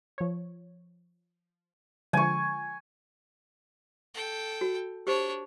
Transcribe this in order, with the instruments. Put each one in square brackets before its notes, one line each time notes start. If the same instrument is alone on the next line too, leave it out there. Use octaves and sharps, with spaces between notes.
[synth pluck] F3 C#5
[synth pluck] D3 F3 G#3 [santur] G#5 C#6
[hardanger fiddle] A4 G5
[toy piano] F#4
[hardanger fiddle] D4 C#5 [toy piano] G4 C5